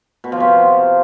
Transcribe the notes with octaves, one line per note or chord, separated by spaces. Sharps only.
B2
F3
C3